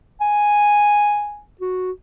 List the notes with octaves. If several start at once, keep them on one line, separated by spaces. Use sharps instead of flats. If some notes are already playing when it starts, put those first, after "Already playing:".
G#5
F#4